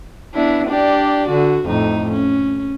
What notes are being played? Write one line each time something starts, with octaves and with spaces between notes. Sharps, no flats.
B3 D4 E4
D4 G4 D5
D3 F#4
F2 A2 D#4
C#4